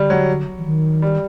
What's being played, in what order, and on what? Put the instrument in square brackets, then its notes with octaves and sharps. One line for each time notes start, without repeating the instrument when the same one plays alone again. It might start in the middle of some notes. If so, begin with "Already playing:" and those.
Already playing: [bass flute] D3 [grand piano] G3
[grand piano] F#3
[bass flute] E3
D#3
[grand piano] G3